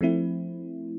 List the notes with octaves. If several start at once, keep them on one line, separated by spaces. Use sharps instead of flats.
F3 A3 C4 E4